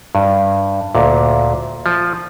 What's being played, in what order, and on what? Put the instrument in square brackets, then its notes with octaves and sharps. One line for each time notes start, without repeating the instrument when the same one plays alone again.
[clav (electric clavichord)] G2
D2 A#2
F3